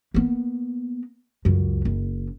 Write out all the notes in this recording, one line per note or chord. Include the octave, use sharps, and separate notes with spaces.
A#3 B3
C#2 F#2
F#1